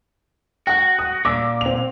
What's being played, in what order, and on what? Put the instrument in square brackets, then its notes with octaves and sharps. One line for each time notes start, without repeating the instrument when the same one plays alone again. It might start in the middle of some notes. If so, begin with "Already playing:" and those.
[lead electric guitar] F#4 [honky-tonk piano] F#5 G5
[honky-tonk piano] D#6
[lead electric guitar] A#2 [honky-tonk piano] D6 E6
[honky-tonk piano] C4 F7